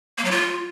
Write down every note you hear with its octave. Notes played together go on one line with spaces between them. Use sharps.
A#3
F#3
F4